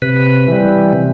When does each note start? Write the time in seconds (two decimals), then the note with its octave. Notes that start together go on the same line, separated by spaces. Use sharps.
0.02 C3 B4
0.48 E3 G3
0.93 C3